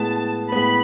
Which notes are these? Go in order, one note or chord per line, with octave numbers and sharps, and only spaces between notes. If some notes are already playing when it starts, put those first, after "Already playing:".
Already playing: A2 G#3 B3 A5
A2 G#3 B3 B5